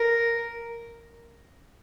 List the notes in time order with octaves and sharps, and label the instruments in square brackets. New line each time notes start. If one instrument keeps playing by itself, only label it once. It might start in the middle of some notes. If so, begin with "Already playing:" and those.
Already playing: [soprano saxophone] A#4